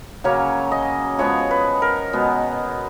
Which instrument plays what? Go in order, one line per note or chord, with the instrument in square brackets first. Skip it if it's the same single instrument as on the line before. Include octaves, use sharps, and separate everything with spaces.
[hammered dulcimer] C#3 F#3 A#3 C#4 C#5
D#5
F3 G#3 B3 C#5
B4
A#4
B2 G#3 B3